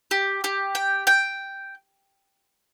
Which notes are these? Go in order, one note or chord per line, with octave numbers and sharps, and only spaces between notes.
G4
G4
G5
G5